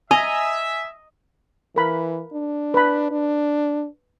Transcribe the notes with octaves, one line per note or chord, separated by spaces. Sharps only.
D#5 E5 G#5 A#5
E3 A#4 B5
D4
B4 A5 B5
D4